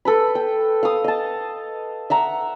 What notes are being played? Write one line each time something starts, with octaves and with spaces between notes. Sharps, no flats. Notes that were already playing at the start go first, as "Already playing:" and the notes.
A4 B4 B5
G5
F5 D#6
D#5 A5
E5 F#5 A#5